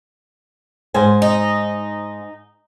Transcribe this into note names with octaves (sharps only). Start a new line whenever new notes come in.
G#2 C5 G#5
D#4